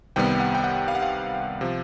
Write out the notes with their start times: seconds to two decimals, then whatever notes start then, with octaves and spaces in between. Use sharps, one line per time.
0.16 C2 C3 D#3 G3 B3 G5
0.40 F#5
0.55 G5
0.64 F#5
0.88 F5
0.95 F#5
1.02 F5
1.61 C3 F3